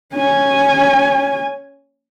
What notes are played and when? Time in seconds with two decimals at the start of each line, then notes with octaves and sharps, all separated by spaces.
0.13 C#4 G#5